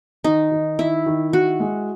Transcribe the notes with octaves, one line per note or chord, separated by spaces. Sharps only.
D#3 D#4
D#3
D#3 E4
D#3
D#3 F#4
G#3